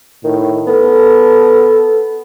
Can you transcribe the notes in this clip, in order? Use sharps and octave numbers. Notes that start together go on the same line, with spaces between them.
A2 D#3
B3 A4